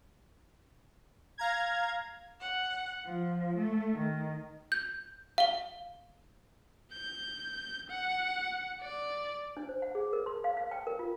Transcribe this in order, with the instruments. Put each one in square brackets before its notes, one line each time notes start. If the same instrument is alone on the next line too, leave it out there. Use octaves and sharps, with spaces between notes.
[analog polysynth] F5 A#5 G#6
[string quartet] F#5
F3
A3
D#3
[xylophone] G6
F5 G7
[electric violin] G6
F#5
D5
[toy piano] D4
C5
F#5
G#4
A#4
C6
F5
F5
G5
A#4
F4